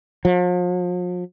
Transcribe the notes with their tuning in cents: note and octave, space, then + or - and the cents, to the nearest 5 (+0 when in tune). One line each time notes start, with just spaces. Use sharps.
F3 +40